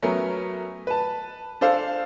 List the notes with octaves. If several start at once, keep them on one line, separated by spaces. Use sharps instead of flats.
F#3 A3 B3 C#4 A#4
B4 A5
D4 A4 C5 F5